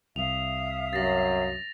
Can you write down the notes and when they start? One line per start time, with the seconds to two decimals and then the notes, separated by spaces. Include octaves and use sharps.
0.16 C2 E5 F5 D#6 F7
0.93 F#2 A6 A#6